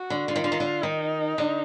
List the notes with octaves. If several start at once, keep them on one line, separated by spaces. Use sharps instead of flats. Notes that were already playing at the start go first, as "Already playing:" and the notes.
Already playing: F#4
D3
D3 F4
D#3
D3
D#3
D3
D#3 D#4
D3